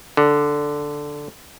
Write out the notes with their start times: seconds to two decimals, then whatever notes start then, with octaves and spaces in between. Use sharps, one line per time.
0.17 D3